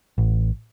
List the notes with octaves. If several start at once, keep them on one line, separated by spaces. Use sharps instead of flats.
A1